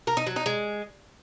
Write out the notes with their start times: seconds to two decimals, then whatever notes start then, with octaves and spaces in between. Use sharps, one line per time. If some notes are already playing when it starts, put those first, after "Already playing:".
0.07 A#4
0.17 D#4
0.27 F#3
0.36 D#4
0.46 G#3